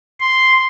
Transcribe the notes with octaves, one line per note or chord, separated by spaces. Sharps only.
C6